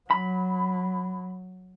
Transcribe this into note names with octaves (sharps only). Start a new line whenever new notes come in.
F#3 B5